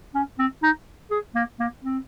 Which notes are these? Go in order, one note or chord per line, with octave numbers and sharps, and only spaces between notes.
C#4
C4
D#4
G#4
A#3
A#3
C4